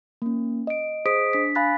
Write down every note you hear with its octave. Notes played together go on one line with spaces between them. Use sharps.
A#3 C#4
D#5 D7
G#4 C5 D#5 D#6 B6 D7
D4 B6
F5 G#5 B5 F#6 A6 B6